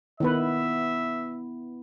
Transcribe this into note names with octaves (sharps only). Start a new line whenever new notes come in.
D#3 B3 E4 B4 E5